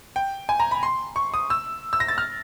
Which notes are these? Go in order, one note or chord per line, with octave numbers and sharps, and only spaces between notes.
G5
G#5
A#5
B5
C6
C#6
D#6
E6
E6
A#6
A6
F6